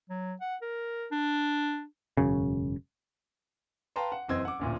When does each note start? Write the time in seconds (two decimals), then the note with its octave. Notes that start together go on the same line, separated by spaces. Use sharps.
0.10 F#3
0.41 F#5
0.62 A#4
1.12 D4
2.17 E1 F#2 C#3
3.96 B4 F5 G5 A5 A#5 C6
4.12 F#5
4.28 F#1 E3 C4 D#5 E6 G#6
4.45 F#5 D6
4.59 A1 D2 A#2